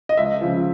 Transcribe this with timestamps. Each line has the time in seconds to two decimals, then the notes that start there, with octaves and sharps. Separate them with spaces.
0.09 D#5
0.17 C#2 E5
0.41 C#3 F3